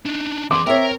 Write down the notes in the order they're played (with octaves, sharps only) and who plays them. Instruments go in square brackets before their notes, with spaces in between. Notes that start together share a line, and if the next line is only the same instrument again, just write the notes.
[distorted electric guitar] D4 D#4
[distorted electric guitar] E2 G#4 [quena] C6 [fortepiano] D6
[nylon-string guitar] C4 C#5 [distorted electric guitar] A#4 A#5 [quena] E5